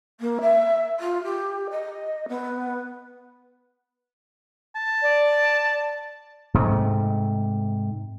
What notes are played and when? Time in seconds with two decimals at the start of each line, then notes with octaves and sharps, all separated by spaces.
0.20 A#3
0.41 E5
0.99 F4
1.24 G4
1.70 D#5
2.28 B3
4.75 A5
5.02 D5
6.54 G#2 C3 A3